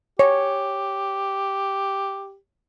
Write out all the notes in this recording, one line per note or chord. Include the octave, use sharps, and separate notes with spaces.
G4 C#5